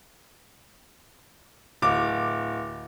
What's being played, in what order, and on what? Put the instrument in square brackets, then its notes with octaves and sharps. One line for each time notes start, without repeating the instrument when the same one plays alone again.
[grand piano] D1 D6